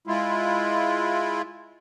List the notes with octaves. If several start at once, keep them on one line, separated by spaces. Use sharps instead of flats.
G#3 E4 F4